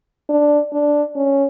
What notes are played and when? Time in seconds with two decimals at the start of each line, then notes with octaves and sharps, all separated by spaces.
0.30 D4
0.73 D4
1.16 C#4